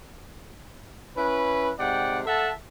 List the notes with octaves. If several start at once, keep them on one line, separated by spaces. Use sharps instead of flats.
C#4 E4 B4
G#2 C3 D5 F#5 G5
A4 E5 F#5 A5